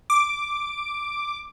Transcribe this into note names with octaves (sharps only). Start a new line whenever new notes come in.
D6